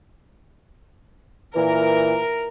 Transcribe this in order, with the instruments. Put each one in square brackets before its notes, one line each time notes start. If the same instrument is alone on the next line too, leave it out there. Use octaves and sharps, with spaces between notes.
[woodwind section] A#2 E3 [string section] A#4